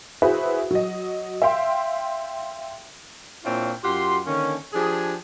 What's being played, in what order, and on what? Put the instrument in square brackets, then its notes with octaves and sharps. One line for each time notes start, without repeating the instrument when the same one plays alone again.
[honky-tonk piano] E4 F#4 G#4 B4 C5 E5
F#3 D#5
E5 F5 G5 C6
[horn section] A#2 C4 D4 E4 F4 C#5
F#2 F4 G4 F#5 C6
D3 D#3 A#3 C#4
F3 D4 G4 G#4